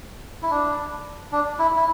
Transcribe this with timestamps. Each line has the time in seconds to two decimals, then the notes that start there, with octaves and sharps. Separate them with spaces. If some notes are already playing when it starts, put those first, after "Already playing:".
0.43 E4
0.51 D4
1.32 D4
1.59 E4
1.76 E4